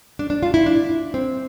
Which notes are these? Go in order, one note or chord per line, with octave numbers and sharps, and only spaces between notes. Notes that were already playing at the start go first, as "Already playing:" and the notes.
D4
D4
F4
E4
D4
C4